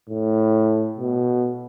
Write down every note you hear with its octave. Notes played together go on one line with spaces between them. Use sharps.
A2
B2